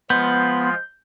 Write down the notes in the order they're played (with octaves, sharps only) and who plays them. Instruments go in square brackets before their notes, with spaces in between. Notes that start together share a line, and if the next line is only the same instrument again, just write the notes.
[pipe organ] F3 G#3 F4 [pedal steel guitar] B3 [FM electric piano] G6